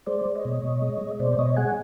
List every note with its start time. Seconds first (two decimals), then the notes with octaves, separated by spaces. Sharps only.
0.07 G#3 C5 D5
0.25 G#3
0.36 C#5 D#5
0.45 B2
0.63 B2
0.82 G#3
1.01 G#3
1.20 B2 C5 D5
1.39 B2 C#5 D#5
1.56 G#3 F#5 G#5